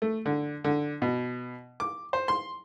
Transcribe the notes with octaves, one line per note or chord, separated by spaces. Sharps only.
A3
D3
D3
B2
D6
C5
C6